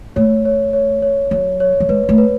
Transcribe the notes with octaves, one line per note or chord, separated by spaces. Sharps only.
A3 C#5
C#5
C#5
C#5
F#3 C#5
C#5
F#3
G#3 B4
A3
B4